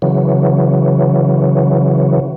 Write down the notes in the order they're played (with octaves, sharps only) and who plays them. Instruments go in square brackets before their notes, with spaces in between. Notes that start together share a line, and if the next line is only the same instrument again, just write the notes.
[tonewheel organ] C#3 E3 F#3